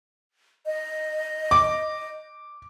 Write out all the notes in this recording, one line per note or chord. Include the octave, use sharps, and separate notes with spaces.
D#5
D6